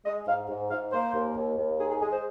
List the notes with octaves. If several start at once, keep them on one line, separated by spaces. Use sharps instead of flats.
G#3 D#5
G#2 F5
G#2
G#2 F5
A#3 C5
D#2
D#2
D#2
D#3 G#4
G#4
G#3 G#4
C5